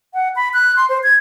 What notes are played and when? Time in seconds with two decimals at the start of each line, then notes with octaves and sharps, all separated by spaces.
0.14 F#5
0.36 B5
0.54 F#6
0.76 C6
0.89 C5
1.03 G#6